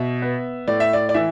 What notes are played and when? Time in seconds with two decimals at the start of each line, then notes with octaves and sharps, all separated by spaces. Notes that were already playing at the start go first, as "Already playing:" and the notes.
Already playing: B2 E5
0.22 B3
0.68 A2 D5
0.80 E5
0.93 D5
1.09 D5
1.14 E3 E5